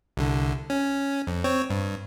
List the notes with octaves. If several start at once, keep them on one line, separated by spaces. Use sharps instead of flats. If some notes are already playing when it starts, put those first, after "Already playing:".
C2 D3
C#4
F2
C4 C#5
G2